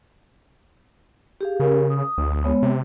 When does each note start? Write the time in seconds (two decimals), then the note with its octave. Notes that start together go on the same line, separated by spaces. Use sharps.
1.41 G4 G#4 F5
1.60 C#3 G4 A#4
1.90 D#6
2.18 D2
2.45 G#3 B3 C#5
2.62 C3